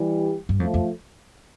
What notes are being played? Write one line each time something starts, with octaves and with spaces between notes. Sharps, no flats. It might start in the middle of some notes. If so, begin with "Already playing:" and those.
Already playing: E3 G3
G2
F2 F3 A3
F2